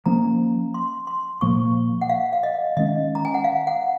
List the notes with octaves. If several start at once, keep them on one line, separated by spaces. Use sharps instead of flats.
F3 A#3 C#4 A#5
C6
C6
A#2 F3 A#3 C#6
F#5
F5
F5
D#5
D#3 G#3 C#4 D#5
A#5
G#5
F#5
F5
F#5